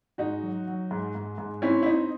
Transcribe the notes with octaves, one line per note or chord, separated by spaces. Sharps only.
G#2 D#4 F#4
F#3
F#3
G#2
G#2
G#2
C4 C#4 E4
E4
C4 D#4